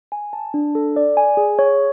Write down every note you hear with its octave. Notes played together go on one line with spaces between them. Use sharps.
G#5
A5
D4
A4
D5
G#5
G#4
C#5